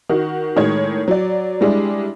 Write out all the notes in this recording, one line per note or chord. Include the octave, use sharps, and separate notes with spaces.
D#3 F#4
A2 D#3 G#3 C#5
F#3 D5
G3 G#3 D4 E4